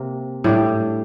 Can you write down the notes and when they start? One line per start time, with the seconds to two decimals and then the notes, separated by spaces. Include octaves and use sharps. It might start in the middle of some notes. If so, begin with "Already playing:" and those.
Already playing: C3 A#3
0.44 A2 G3 D4 G4